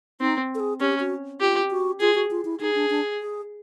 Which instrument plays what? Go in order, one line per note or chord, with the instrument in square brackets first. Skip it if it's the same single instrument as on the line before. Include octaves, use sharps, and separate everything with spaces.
[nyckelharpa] C4 [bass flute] D#4
[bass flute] A4
G#4
[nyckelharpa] C#4 [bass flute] G4
[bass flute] F#4
[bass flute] F4 [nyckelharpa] G4
[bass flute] F#4
[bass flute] F4 [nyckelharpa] G#4
[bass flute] F#4
F4
E4
[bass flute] D#4 [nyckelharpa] G#4
[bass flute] D4
D4
G#4